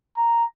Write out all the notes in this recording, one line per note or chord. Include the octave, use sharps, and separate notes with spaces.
A#5